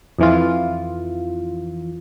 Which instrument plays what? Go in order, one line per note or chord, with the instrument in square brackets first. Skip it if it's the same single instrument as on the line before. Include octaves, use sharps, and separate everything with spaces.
[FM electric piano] F2 E3 F4